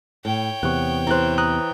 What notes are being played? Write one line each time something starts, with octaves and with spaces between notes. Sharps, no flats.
A2 C#5 G5
E2 C3 B3 C#6 F#6
E3 C5 A#5 F#6
A#5 D#6 F#6